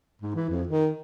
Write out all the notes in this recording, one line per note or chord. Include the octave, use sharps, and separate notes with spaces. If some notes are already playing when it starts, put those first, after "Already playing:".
G#2
E3
F2
D#3